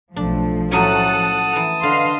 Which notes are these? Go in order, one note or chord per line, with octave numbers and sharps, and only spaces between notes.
B1 F3 A3 D4
A2 F#3 C#4 A4 F#5 A5 D#6 F#6
E3 A#5
D3 B4 D#5 F5 C6